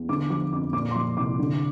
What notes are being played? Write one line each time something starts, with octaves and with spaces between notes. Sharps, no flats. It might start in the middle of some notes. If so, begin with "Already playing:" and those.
Already playing: E2
D3 D6
F3 D6
F2 D6
A#2 D6
C6
F3 D6
C2 D6
D3